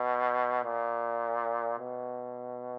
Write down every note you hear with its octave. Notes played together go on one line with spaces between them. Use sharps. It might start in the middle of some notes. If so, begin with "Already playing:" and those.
Already playing: B2
A#2
B2